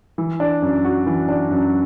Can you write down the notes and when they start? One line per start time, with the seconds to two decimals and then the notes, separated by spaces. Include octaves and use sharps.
0.18 E3
0.40 D4
0.62 F#2
0.85 F#4
1.06 E3
1.29 D4
1.51 F#2